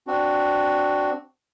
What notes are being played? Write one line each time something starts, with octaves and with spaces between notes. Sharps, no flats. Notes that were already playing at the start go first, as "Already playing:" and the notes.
C4 D4 F#4